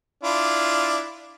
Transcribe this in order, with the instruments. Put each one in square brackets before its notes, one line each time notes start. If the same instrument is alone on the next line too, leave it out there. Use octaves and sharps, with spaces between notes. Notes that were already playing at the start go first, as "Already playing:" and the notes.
[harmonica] D4 E4 F4